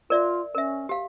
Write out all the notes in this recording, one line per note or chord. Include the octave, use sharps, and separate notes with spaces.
F4 A#4 D5 E5
C#4 A#4 E5
G4 F5